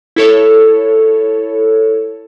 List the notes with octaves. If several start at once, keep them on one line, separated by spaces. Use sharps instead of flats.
E4 A4 C#5